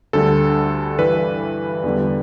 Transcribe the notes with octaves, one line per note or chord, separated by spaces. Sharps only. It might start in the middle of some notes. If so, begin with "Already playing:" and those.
D2 D3 G3 A4
G2 E3 G3 B4
E2 D3 G3